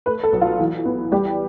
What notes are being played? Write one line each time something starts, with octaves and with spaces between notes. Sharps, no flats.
A3 B4
A4
B1
F4
E3
B3
G3 G4